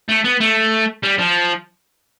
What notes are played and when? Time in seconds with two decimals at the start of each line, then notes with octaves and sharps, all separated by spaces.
0.09 A3
0.24 B3
0.40 A3
1.03 G3
1.18 F3